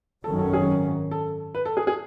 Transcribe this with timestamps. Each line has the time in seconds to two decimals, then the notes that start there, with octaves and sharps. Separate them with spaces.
0.24 G#1 F#2 D#3 F#3 C#4 A4
0.39 A4
0.53 G#4
1.11 A4
1.55 B4
1.65 A4
1.77 G#4
1.87 G#4